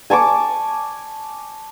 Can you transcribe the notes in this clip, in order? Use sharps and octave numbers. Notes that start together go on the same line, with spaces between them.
G#5 A5 C#6 D6